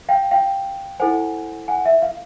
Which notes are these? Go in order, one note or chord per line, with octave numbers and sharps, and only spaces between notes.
F5 G5
F5 G5
E4 A4 C5 F#5 G#5
F#5 G#5
E5
F5